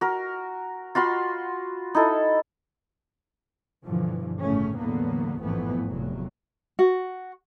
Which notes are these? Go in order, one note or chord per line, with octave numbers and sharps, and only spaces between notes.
F#4 A#4
F4 F#4 B5 C6
D#4 E4 A4
G2 B2 D3 E3 F3
G1 A2 C#3 A3 C#4
E2 A2 D3 F#3 A#3 B3
A1 F2 G#2 E3 A3 B3
F1 E2 F#3
F#4